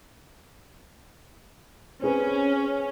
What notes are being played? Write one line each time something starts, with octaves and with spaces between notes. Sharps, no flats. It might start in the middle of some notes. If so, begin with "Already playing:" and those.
C4 C#4 G#4 B4